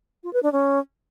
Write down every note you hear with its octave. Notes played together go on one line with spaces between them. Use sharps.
F4
B4
D4
C#4